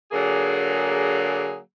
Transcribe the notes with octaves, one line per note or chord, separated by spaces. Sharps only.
D3 F#3 A#3 G#4